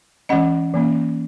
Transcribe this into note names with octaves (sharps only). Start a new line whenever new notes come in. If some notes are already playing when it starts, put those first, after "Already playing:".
E3 G#3 C#4 D#5 F#5
E3 A#3 C#4